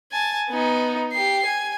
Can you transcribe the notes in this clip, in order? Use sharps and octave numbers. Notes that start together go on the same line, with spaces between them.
G#5 A5
B3 D#4
G4 C7
G#5